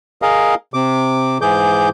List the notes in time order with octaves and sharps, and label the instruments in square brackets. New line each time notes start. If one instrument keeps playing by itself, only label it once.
[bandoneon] G#4 A#4 D#5 F5
C3 D6
G#2 E3 G#4 D6 G6